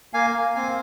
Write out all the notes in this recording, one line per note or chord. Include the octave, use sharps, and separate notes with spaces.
A#3 F5 G#5
A#3
C4 F5 G#5